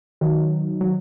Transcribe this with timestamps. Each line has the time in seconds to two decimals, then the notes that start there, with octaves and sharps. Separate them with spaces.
0.21 D#3 F#3
0.81 F#3